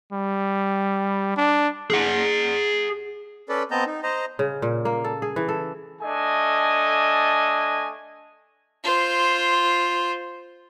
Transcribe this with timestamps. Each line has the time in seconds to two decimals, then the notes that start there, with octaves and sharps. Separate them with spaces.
0.13 G3
1.37 D4
1.90 G#4 F#5
3.49 C#4 A4 B4 D5
3.71 B3 C4 D#5 A5 A#5 G6
3.86 D#4
4.03 C5 D#5 A#5
4.39 C#3
4.62 A#2
4.85 A#3
5.05 A4
5.22 G#4
5.36 E3
5.49 A4
6.02 A3 D4 A4 D#5 G#5
8.83 F4 C5